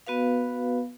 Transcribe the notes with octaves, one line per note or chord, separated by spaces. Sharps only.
B3 F#4 B4 F5